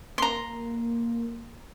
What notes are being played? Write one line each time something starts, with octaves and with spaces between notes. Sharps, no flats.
A#3 A#5 C6